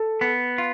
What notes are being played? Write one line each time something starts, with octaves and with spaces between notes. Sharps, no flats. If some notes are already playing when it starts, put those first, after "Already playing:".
Already playing: A4
B3
F4